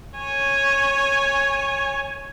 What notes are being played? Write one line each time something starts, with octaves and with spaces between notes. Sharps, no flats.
C#5 G#5